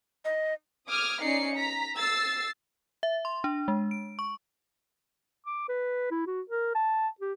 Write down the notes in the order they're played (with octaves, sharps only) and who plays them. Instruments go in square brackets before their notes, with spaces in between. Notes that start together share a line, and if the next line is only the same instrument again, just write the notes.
[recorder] D#5
[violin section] D6 D#6 F6 G#6
C#4 D#4 D5 C7 C#7
A#5 B6
E6 A6 C7
[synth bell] E5
C6
D4
G#3
D7
C#6
[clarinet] D6
B4
E4
F#4
A#4
A5
G4